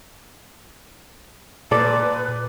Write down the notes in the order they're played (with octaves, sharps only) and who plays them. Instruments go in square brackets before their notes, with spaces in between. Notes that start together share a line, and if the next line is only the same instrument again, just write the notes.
[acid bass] A#2 [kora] A4 D5 [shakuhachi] B4